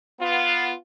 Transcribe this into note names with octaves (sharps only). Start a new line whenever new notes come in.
B3 F4